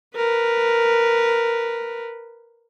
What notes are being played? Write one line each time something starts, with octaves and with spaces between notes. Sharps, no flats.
A#4 B4